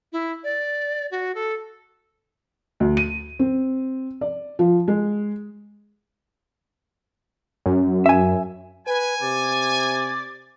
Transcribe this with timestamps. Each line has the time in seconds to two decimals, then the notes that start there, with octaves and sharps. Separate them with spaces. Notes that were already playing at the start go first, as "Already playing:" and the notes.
0.12 E4
0.44 D5
1.11 F#4
1.35 A4
2.80 D2
2.97 D#7
3.39 C4
4.21 D5
4.59 F3
4.88 G#3
7.66 F#2
8.06 E5 G#5
8.87 B4 G#5
9.22 C3 D5